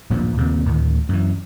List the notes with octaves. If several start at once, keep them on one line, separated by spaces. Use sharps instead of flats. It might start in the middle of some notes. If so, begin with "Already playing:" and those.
D1 G2 A#2 F3
D#2 A#2 C#3 C4
D2 A2 D#3
F#2 E3